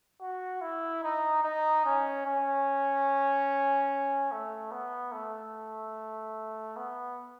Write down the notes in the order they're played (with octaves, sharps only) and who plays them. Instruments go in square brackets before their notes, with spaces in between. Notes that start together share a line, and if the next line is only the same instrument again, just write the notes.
[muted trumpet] F#4
E4
D#4
D#4
C#4
C#4
A3
B3
A3
B3